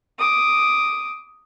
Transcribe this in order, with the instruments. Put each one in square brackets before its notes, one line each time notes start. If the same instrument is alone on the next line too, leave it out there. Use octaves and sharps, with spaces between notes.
[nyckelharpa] D6 D#6